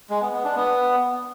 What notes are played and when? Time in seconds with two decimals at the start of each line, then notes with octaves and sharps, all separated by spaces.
0.10 G#3
0.21 B3
0.33 B3
0.44 D4
0.56 B3